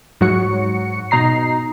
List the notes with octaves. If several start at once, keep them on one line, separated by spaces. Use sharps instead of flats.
G#2 F#3 F#4 C#7
B2 D#4 A#5 C7